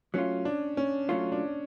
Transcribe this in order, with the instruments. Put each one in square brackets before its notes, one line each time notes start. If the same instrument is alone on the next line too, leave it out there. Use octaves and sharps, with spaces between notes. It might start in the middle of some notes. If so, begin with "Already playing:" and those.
[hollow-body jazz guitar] F#3 A3 F4 [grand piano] C#4
[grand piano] D4
C#4
[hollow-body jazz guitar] F#3 A3 F4 [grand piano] C#4
[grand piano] D4